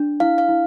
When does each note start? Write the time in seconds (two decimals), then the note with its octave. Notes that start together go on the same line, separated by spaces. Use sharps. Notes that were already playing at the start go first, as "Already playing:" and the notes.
Already playing: D4
0.20 E4 F5
0.38 F5
0.49 E4